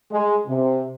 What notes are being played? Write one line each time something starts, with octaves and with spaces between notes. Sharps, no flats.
G#3
C3